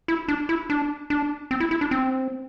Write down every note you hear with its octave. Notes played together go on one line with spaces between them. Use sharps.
E4
D4
E4
D4
D4
C4
E4
E4
D4
C4